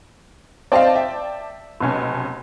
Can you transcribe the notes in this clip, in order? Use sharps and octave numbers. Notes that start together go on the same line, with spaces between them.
C4 D5 D#5 F5 G5 A5
E5
F1 B1 C#4